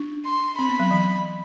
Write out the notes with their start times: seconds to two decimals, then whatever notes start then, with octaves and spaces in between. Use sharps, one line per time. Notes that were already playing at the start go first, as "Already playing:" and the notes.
Already playing: D4
0.26 C6
0.59 C4 B5
0.69 B3
0.79 F#3
0.91 E3